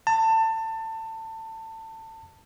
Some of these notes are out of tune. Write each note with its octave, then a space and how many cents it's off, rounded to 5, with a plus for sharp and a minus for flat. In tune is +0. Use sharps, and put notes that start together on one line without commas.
A5 +25